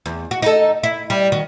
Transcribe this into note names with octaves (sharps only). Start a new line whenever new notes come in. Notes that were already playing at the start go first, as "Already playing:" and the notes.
E2
F#4
D#4 A4
E4
G3
D#3 F#4